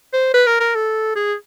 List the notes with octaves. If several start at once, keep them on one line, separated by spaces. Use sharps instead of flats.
C5
B4
A#4
A#4
A4
G#4